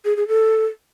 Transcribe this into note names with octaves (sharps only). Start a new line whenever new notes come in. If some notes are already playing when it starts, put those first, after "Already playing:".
G#4
G#4
A4